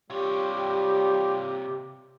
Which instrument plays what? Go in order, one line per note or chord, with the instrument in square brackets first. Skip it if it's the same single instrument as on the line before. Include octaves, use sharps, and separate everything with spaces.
[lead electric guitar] C3 C#5 [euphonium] G3 [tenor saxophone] F4 [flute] G4